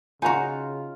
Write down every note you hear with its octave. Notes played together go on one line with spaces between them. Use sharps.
C#3 D#4 F4 F#4 G#5 A#5